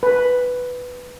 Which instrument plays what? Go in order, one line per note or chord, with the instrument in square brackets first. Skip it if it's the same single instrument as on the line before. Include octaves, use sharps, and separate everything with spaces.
[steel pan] B4